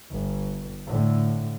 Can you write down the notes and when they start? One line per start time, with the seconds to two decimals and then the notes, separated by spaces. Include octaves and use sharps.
0.11 G1
0.88 A2 D3